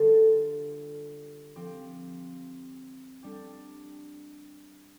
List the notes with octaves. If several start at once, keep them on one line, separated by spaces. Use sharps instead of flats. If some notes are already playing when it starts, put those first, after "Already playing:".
Already playing: D3 G3 F4 A4
F3 C4 G4
G3 D4 G4